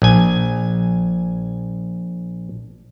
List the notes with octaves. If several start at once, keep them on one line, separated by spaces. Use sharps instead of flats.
A#1 G#5